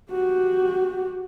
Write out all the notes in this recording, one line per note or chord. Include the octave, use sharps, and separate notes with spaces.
F#4 G4